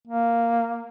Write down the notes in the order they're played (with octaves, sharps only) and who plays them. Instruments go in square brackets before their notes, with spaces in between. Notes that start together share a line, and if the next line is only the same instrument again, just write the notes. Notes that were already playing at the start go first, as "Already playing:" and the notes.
[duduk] A#3